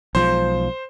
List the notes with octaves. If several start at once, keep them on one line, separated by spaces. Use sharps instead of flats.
B1 F3 G#3 C5